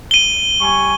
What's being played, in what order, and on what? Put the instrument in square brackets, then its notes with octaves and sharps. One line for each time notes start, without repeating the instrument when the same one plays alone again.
[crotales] D#7 G7
[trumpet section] G3 G#5 C#6